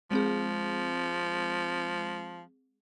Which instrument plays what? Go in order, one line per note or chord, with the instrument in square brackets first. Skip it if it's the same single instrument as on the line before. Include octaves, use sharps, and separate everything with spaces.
[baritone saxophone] F3 [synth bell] G#3 C4 G#4